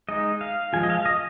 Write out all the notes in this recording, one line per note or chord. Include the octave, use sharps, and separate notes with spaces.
G#3 D#4 D#5
F5
F3 G#3 F4 G#5
D#5
F5
D#5